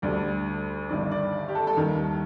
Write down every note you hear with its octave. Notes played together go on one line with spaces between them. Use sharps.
D2 D3 G3 D5
G1 G2 D#3 D5
D5
G4
A4
A4
D#2 D#3 G3 A#4